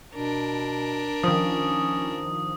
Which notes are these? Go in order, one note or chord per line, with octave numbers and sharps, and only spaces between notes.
B2 D4 A#4
D#3 F3 C#4 D#6